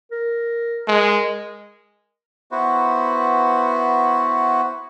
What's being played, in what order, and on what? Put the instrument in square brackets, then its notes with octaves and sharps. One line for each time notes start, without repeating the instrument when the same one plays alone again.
[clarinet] A#4
[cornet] G#3 [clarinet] A#4
[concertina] B3 E4 F#4 B4 C5